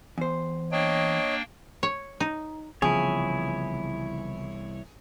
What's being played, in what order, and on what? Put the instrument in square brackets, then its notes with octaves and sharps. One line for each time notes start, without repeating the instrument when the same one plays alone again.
[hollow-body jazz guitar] E2 C5
[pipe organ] A#3 D4 G5 [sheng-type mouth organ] C#5 D#5
[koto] C#5
D#4
[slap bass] C2 E3 B3 [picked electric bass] C#3 F3 [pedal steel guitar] E4 C#5 [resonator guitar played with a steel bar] G#4